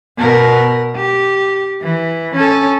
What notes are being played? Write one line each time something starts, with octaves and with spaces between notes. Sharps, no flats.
B2 A#4
G4
E3
C#4 A4